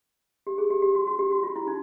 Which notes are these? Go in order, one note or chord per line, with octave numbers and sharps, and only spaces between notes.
G4
G#4
G4
G4
F#4
F#4
G4
F#4
F4
E4
D#4